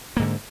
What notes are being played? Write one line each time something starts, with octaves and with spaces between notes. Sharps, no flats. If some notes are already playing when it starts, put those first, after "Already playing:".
G#2 D3 A#3